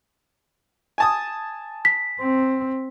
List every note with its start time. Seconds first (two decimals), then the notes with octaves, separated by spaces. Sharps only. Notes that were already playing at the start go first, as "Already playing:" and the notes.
0.98 G#5 A5 D#6
1.85 B6
2.20 C4